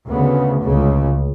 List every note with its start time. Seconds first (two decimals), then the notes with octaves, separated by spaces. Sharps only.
0.10 D2 C#3 B3
0.64 C#2 C#3